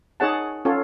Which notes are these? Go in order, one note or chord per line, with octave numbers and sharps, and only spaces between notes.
D#4 G#4 C#5 F#5 A5
C#4 F4 A4 C#5